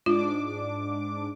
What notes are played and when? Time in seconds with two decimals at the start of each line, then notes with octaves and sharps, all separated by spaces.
0.06 G#2 D4 F4 D6